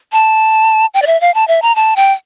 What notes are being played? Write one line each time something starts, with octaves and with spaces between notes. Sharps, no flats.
A5
G5
D5
E5
F5
A5
E5
A#5
A5
G5